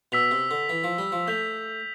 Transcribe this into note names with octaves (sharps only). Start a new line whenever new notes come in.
B2 E6 B6 F7
C3
D3
E3
F3
G3
F3
A3 E6 G6 B6 F7